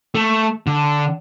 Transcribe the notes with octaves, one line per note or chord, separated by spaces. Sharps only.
A3
D3